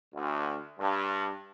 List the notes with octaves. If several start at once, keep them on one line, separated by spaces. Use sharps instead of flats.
D2
G2